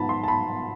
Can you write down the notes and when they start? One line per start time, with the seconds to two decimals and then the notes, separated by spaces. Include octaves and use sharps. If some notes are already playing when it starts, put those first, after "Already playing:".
Already playing: G#2 F3 B3 A5 B5
0.09 C6
0.24 A5
0.28 B5